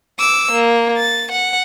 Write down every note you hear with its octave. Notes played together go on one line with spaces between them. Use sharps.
D6 E6
A#3
A6
F#5